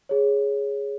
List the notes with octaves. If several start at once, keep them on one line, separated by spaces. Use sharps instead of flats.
G#4 C#5